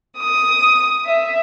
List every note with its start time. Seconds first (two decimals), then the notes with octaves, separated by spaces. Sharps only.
0.18 D#6
1.06 E5